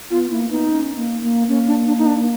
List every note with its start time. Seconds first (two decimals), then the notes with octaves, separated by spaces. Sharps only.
0.10 B3 F4
0.30 A#3 E4
0.49 B3 D#4
0.70 C#4
0.96 A#3
1.22 A#3
1.48 A#3 C#4
1.67 D4
1.86 D4
1.98 D#4
2.06 D4